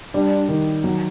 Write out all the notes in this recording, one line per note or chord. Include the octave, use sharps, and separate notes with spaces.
G3 D4
D#3
F#3